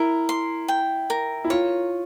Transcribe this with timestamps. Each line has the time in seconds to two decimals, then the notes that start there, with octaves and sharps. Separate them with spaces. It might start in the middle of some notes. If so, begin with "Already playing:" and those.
Already playing: E4 A#4
0.29 C6
0.68 G5
1.10 A#4
1.44 E4
1.50 F4 C#5